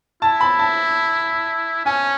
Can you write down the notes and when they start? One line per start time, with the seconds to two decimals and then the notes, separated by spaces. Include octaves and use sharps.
0.22 E4 A5
0.41 B5
0.59 A5
1.85 C#4 G#5